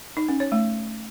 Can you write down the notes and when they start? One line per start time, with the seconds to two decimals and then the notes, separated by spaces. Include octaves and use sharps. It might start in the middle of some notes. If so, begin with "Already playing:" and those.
0.17 D#4
0.28 C#4
0.40 C#5
0.52 A3